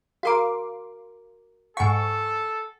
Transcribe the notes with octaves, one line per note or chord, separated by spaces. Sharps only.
F#4 A#4 F5 A#5 C6 D6
G#2 A4 F#5 G#5 C#6